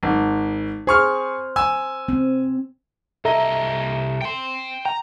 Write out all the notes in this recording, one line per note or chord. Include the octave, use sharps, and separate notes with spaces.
G#1
G#4 C5 C#6 F6
G#5 E6
C4
C2 A4 D#5 E5 A#5
G5 C6
G5 A#5